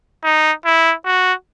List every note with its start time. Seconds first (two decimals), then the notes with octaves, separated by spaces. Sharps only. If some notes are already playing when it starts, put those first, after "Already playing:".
0.24 D#4
0.65 E4
1.05 F#4